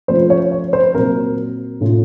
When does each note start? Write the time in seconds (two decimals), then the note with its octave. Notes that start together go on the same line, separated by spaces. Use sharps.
0.08 F3 A3 C#4 F4 C5
0.30 C#5
0.52 C#5
0.73 C5
0.94 A#2 F#3 C4 A#4
1.81 A2 A3 C#4 F4